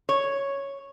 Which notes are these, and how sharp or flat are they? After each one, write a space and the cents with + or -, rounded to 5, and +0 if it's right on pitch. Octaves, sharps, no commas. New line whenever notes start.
C#5 +0